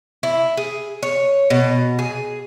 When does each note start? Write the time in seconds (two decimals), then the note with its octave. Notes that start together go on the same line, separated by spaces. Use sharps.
0.23 E4
0.57 G#4
1.03 C#5
1.50 B2
1.99 G#4